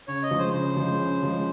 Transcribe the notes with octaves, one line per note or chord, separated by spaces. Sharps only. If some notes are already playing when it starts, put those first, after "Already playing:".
C#3 C#5
D#5
F3 G#3
C5
C#3 C5
F3 G#3
C#3
F3 G#3